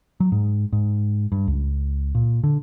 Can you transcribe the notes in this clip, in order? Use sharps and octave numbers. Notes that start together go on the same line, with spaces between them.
F#3
G#2
G#2
G2
C#2
A#2
D3